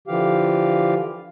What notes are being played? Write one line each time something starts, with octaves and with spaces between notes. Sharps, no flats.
D3 E3 F3 G4 F5